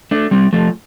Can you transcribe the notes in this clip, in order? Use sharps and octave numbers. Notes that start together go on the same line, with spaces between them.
A3 D4
G3 C4
F3 A3